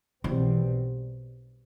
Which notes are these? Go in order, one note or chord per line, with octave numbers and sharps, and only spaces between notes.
B1 B2 E3 G3 C4